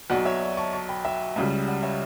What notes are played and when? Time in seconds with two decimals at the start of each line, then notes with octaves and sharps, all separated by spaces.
0.10 B1 B2 F#3 D5 F#5
0.25 C#5 E5
0.42 D5
0.57 A5 C#6
0.73 A5 C#6
0.89 G5 B5
1.05 E5 G5
1.36 C#2 C#3 G3
1.68 D5 F#5
1.83 C#5 E5